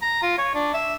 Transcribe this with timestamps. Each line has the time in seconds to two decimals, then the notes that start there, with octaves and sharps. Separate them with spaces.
0.02 A#5
0.22 F4
0.38 C#5
0.55 D4
0.74 E5